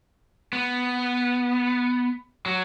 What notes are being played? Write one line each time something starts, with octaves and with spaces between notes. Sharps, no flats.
B3
F#3